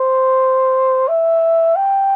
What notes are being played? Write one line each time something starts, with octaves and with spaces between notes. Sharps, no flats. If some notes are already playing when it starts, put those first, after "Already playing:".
Already playing: C5
E5
G5